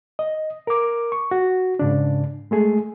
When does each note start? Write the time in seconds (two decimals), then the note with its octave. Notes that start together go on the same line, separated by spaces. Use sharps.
0.19 D#5
0.67 A#4 D6
1.12 C#6
1.31 F#4
1.79 G#2 C#3 D4
2.51 G#3 A3 G#4